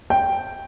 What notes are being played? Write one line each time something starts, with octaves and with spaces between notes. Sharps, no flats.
G5